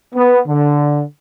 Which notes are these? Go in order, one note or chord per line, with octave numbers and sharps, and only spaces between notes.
B3
D3